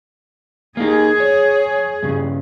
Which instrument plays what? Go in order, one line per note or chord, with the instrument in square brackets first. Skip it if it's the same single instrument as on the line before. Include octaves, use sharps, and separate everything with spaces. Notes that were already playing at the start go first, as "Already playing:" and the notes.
[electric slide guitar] A#3 D#4 [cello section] G#4
[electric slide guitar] C#5
G2 C#3